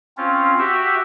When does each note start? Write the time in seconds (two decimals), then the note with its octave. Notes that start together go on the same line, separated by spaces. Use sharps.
0.17 C4 C#4 F4
0.58 F#4 G4 E5